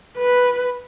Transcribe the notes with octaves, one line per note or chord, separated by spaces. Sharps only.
B4